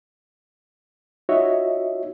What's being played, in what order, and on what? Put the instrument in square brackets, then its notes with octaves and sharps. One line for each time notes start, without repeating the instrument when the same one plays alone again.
[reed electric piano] D#4 F4 F#4 C#5 D#5 E5